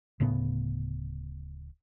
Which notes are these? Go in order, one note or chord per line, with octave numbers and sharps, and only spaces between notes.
D1 A2 C#3 B3